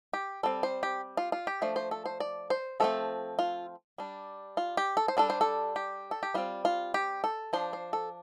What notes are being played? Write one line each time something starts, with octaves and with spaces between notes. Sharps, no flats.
G4
G3 C4 A4
C5
G4
F4
F4
G4
F3 A3 D4 C5
C5
A4
C5
D5
C5
F3 A3 C4 A4
F4
G3 D4
F4
G4
A4
C5
G3 D4 A4
C5
A4
G4
A4
G4
G3 C4 F4
F4
G4
A4
F3 D4 C5
C5
A4